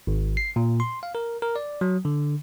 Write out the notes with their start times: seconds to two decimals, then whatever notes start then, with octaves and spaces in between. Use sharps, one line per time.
0.07 G#1
0.37 C7
0.56 A#2
0.80 C6
1.03 F5
1.15 A#4
1.42 A#4
1.56 D5
1.81 F#3
2.05 D3